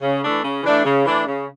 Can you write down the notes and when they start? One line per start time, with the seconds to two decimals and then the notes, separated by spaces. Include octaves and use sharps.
0.01 C#3
0.23 E3 A3 D4
0.43 C#3
0.63 E3 A3 D4
0.84 C#3
1.04 E3 A3 D4
1.26 C#3